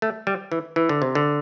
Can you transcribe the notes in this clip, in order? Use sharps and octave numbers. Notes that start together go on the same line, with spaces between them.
A3
G3
E3
E3
D3
C3
D3